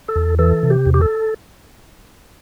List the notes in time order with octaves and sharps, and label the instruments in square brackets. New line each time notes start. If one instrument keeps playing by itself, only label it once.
[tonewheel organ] A4
E2
E3 A4
C3
G4
E2
G4
A4